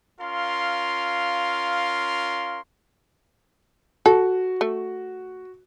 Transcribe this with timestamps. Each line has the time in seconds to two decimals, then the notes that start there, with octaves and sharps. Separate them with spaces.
0.19 C#4 F4 A#4 F5 C6
4.06 F#4 A4
4.61 A3